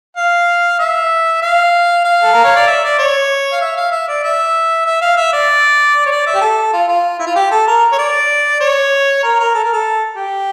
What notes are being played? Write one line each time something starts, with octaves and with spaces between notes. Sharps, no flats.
F5
E5
F5
F5
A4
A#4
C#5
D5
E5
D5
C#5
F5
E5
F5
E5
D5
E5
E5
F5
E5
D5
C#5
D5
E5
G4
A4
F4
F4
E4
F4
G4
A4
A#4
C#5
D5
C#5
A#4
A#4
A4
A#4
A4
G4